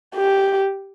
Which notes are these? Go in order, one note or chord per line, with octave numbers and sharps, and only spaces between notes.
G4